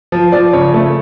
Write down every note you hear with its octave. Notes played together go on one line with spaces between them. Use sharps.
F3
F3 D5
C#3 C#5
A3